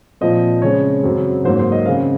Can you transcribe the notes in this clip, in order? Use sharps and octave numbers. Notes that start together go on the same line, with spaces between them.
A#2 F3 C4 D#5
C#3 G#3 C4 C#5
F#2 C#3 F#3 C4
G#2 F#3 A#3 C5
C5
D#5
C#3 G#3 C4 F5